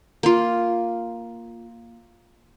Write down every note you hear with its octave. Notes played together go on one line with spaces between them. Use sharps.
A#3 F4